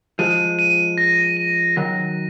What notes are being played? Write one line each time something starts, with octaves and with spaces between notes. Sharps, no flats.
F3 G#3 D#7
D#7
A#6
D#7
D#3 F#3 A#6